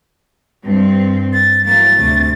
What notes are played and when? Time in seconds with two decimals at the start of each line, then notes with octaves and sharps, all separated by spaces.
0.62 G2 C4
1.33 A6
1.65 E3 F#3 A#3 A6
1.98 D2 C3 A3